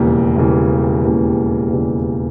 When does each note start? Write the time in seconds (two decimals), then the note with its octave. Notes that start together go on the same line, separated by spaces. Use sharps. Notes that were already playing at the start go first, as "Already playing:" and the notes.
Already playing: E1 D#2 C#3 E3 G3
0.36 E1 D#2 C#3 E3 G3
1.04 E1 D#2 C#3 E3 G3
1.71 E1 D#2 C#3 E3 G3